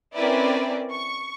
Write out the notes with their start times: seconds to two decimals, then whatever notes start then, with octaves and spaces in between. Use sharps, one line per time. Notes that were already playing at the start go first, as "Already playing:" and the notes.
0.15 C4 C#4 E4 A#4 B4 D5
0.91 C#6